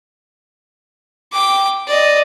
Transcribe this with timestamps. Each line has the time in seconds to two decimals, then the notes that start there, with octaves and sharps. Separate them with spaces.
1.32 G5 D6
1.87 D5 D#5